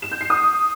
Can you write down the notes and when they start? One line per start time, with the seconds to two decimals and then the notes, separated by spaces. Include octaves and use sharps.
0.02 E7
0.12 G6
0.21 C7
0.30 D#6